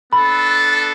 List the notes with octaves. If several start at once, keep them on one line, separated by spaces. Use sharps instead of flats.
B3 D4 A4 B5